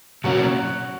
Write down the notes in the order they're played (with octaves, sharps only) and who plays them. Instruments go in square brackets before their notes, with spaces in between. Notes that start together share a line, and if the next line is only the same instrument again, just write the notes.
[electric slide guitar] B2 F#3 A#3 C#4 [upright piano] F#4 F#5